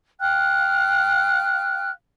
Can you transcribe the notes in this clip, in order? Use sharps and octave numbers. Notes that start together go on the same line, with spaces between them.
F5 G5 F6 F#6